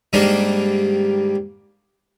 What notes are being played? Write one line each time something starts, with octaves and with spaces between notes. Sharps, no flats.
G#2 D#3 G3 A#3 D4 D#4